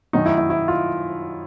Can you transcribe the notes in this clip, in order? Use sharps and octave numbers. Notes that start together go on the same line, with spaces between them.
F#2 D#3 F#3 D#4
E4
E4
E4
F4